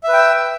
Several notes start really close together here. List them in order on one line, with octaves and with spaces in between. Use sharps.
E5 B4 G5 E6